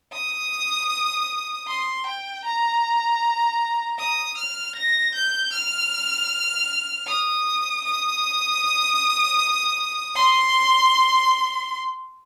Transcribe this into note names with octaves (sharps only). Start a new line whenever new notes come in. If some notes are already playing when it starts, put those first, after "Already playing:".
D#6
C6
G5
A#5
D#6
F6
A#6
G6
F6
D#6
D#6
C6